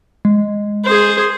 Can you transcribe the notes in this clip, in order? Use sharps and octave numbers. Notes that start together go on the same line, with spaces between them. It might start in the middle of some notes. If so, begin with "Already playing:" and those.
G#3
G#4 C5